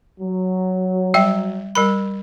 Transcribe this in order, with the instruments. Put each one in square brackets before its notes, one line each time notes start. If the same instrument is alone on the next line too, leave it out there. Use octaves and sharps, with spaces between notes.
[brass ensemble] F#3
[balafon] G3 E5 G5
G3 A#4 B5